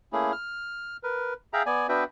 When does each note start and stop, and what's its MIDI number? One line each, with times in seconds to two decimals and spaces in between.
0.13 0.32 57
0.13 0.32 58
0.13 0.32 61
0.13 0.32 64
0.13 0.32 68
0.32 0.97 89
1.03 1.34 70
1.03 1.34 71
1.53 1.63 68
1.53 1.63 76
1.53 1.63 77
1.53 1.63 79
1.53 1.63 82
1.66 1.87 59
1.66 1.87 74
1.66 1.87 80
1.89 2.04 59
1.89 2.04 62
1.89 2.04 66
1.89 2.04 71
1.89 2.04 76
1.89 2.04 79